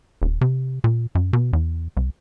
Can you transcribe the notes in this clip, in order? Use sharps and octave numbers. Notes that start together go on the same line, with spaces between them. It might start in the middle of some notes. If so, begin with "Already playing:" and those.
D#1
C3
A#2
F#2
B2
E2
C2